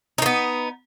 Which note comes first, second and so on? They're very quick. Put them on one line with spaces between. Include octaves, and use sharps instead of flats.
D#4 A#3 B3